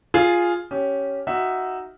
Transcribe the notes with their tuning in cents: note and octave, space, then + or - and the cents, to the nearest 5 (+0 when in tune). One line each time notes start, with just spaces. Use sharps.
F4 +0 G#4 +0
C#4 +0 G4 -10
D#4 +0 F#4 +0 E5 +0